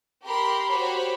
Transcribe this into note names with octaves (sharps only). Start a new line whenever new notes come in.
G4 A#4 B5 C6
F#4 G4 C5 C#5 B5